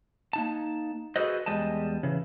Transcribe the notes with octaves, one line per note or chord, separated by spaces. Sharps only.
A#3 D#4 A5
F#4 G#4 A4 B4 C5 D#5
E2 G3 G#3 D#5 A5
C#3 E3